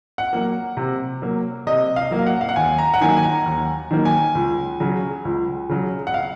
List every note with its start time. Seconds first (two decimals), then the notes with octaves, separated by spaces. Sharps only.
0.18 F#5
0.33 F#3 A#3
0.77 C3
1.22 F#3 A#3
1.67 C3 D#5
1.96 F5
2.11 F#3 A#3
2.26 F#5
2.41 F5
2.49 F#5
2.56 D#2 G#5
2.78 A#5
2.94 F#5
3.01 D#3 F#3 A#3 G#5
3.17 G#5
3.23 A#5
3.46 D#2
3.91 D#3 F#3 A#3
4.05 G#5
4.35 C#2
4.80 C#3 F#3
5.25 C#2
5.69 C#3 F#3
6.07 F#5
6.14 F5